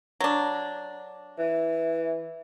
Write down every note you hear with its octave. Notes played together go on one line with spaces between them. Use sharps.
F#3 D4
E3 E5